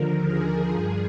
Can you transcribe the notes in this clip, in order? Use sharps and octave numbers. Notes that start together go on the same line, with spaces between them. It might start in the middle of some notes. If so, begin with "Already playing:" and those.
Already playing: D#2 D3 F3 A#4
G#4
G2 F3